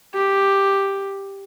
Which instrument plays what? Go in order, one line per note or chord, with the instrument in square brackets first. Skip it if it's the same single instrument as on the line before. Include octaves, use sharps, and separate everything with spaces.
[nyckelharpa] G4